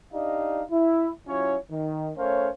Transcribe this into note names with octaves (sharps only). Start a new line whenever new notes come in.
D4 D#4 G4 D5 D#5 F5
E4
F#3 C#4 E4 F4 C#5
D#3
A3 C#4 A#4 C5 C#5 F5